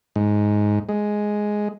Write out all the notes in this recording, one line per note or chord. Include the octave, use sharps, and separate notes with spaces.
G#2
G#3